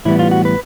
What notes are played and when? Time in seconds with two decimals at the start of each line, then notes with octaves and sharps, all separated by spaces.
0.05 A2 E3 G3 B3 E4
0.19 F4
0.31 F#4
0.45 B4